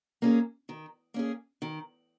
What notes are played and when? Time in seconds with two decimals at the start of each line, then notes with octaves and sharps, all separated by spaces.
0.22 A#3 C#4 G#4
0.69 D#3
1.14 A#3 C#4 G#4
1.62 D#3